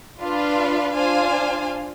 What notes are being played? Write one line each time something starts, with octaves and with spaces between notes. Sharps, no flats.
D4 F4 B4 F5
D4 F4 C5 F5 G#5